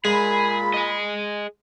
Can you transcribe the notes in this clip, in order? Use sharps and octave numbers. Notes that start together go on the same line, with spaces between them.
A#2 G#3 G#4 B5
G#4 D#5